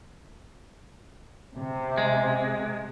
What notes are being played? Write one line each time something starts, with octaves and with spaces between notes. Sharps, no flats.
C3
G#3